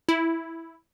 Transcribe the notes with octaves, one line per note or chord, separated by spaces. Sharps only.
E4